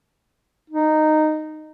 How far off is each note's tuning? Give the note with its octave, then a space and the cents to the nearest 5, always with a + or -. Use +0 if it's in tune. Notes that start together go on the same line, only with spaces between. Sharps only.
D#4 -10